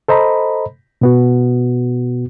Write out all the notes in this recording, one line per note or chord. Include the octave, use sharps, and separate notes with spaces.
A4 C5 D#5 A#5 B5
B2 B3 F#4